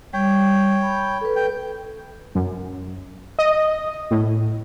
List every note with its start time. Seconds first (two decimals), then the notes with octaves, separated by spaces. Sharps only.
0.13 G3 C#5 G5
0.82 B5
1.21 A4 B4
1.36 G5
2.35 F#2
3.39 D#5
4.11 A2